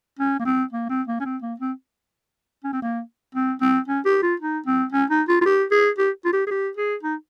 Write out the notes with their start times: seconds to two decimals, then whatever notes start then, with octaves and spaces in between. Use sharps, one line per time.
0.19 C#4
0.40 A#3
0.45 C4
0.73 A#3
0.89 C4
1.07 A#3
1.20 C#4
1.25 C4
1.42 A#3
1.60 C4
2.64 C#4
2.73 C4
2.82 A#3
3.35 C4
3.61 C4
3.88 C#4
4.06 G4
4.22 F4
4.40 D#4
4.66 C4
4.92 C#4
5.10 D#4
5.28 F4
5.41 F4
5.46 G4
5.71 G#4
5.98 G4
6.25 F4
6.33 G4
6.47 G#4
6.51 G4
6.77 G#4
7.03 D#4